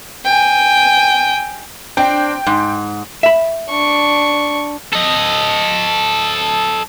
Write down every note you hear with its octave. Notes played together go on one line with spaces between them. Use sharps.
G5 G#5
C4 D4 G5
G#2
E5 B5
D4 C#6
A4 D#5